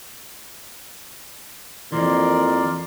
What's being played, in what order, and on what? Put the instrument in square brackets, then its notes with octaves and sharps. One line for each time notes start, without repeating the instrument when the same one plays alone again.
[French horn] F2 [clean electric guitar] E3 A#3 [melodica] A#4 D5 C6